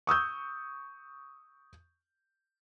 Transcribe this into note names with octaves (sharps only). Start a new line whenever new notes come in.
C#6 D#6 E6 G6